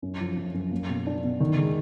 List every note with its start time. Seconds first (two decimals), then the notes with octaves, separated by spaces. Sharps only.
0.02 F#2
0.20 F3
0.37 F#2
0.54 F#2
0.71 A#3
0.89 B2
1.07 D4
1.24 B2
1.40 D#3
1.58 G#3